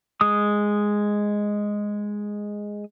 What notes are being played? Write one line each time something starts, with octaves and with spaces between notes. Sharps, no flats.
G#3 D#6